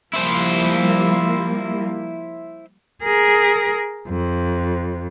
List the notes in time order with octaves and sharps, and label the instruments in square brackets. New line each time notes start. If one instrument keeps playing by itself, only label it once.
[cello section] F3 G3 A#3 [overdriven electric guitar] E4 C5
[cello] G#4 A#4
F2